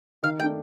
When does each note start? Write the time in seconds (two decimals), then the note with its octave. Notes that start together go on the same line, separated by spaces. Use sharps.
0.23 D#3 F5
0.39 A3 G5
0.44 D4